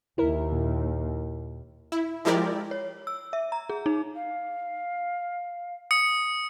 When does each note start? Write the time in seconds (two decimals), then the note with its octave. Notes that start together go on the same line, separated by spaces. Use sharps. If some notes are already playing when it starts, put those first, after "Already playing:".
0.18 D#2 E4 A#4
0.52 A#2
1.92 E4
2.25 F3 G#3 E4 G4 A#4 D5
2.71 C#5
3.07 E6
3.33 E5
3.52 A#5
3.69 G#4
3.86 D#4
4.15 F5
5.91 D#6 C#7